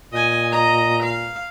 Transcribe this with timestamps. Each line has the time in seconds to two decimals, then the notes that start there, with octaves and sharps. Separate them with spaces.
0.13 A#2 D#5 G#5
0.52 D#5 A#5
1.03 F5